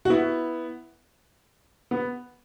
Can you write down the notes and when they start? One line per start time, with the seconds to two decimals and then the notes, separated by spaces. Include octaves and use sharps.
0.05 F#4
0.10 B3 E4
1.91 B3